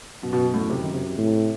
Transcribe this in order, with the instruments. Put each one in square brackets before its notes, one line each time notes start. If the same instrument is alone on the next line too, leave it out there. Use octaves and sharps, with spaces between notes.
[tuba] F#2 [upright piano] B2
[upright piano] B2
A2
C3
D#3
C3
[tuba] A2